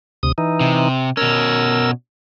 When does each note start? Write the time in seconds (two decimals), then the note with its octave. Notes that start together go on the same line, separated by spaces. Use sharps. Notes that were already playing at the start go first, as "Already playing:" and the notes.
0.23 D2 C3 D#6
0.38 E3 D#4
0.60 C3
1.17 B2 C#4 A#4 E6